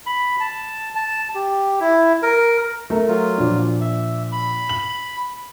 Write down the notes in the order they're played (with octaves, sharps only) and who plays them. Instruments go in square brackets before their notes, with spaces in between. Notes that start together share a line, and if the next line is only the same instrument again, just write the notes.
[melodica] B5
A5
A5
G4
E4
A#4
[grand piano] A3 A#4
[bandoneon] F#3 F4
[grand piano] A#2 F3 D4
[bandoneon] E5
B5
[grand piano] F#7